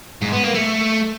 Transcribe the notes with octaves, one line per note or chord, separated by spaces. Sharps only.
G#2
B3
A#3
A3